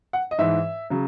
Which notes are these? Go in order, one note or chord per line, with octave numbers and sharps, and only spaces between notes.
F#5
D#5
G#2 E3 E5
C#3 F#3